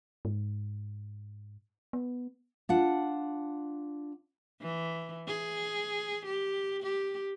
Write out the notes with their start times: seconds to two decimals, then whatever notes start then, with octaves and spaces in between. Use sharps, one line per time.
0.25 G#2
1.93 B3
2.69 D4 F4 F#5
4.61 E3
5.28 G#4
6.26 G4
6.83 G4